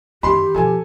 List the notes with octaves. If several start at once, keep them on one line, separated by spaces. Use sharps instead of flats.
F#2 D#3 G4 B5 C6
B2 F3 A4 G#5